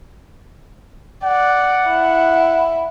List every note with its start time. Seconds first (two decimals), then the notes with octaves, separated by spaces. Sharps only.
1.24 D5 F#5
1.87 E4